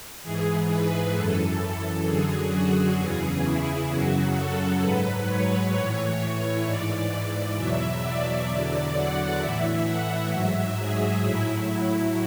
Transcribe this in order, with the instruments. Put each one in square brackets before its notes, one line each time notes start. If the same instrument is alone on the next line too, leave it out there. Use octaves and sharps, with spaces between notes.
[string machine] G#2 E3 G#4
B4
F#2 E3 A4
F#2 D3 F#3 G#4
F#4
E2 C#3 E3 G#4
E4
F#2 C#3 F#3 F#4
A4
G#2 F#3 B4
C#5
A2 E3 C#5
G#2 E3 D5
E2 B2 F#3 E5
D5
E2 D3 F#3 D5
F#5
A2 E3 E5
F#5
G#2 F#3 E5
G#4
A2 F#3 E4